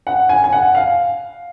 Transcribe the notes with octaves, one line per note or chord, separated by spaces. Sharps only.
F#5
G#5
G#5
F#5
F5